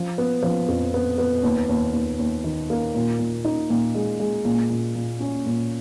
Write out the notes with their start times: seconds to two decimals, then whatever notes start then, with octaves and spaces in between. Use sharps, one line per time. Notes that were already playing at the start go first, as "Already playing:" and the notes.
Already playing: F3
0.18 B3
0.42 F3
0.68 F2
0.94 B3
1.18 B3
1.43 D#2
1.69 D#2
1.93 D#2
2.19 D#2
2.44 D#3
2.70 A#3
2.95 A#2
3.19 A#2
3.44 D#4
3.70 A#2
3.95 G#3
4.20 G#3
4.45 A#2
4.70 A#2
4.96 A#2
5.20 C#4
5.46 A#2